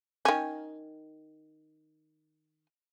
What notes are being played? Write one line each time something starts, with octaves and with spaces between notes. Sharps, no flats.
D#3 C#4